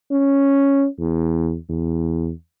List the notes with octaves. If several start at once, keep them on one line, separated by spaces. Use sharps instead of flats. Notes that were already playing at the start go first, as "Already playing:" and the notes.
C#4
E2
E2